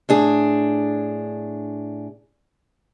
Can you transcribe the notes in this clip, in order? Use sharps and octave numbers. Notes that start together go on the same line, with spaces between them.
A2 D4 G#4